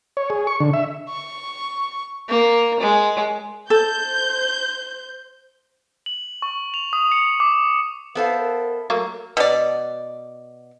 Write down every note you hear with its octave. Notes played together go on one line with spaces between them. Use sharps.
C#5
G#4
C#6
D3
E5
C#6
A#3
G#3
A4 C5 G6
F#7
C#6
F7
D#6
C#7
D6
B3 E4 A4 B4 C5 F5 A5
A#4
F#3 A3 A#3
B2 D5